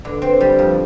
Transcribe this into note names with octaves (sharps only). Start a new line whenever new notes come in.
D3
C4
G3
F2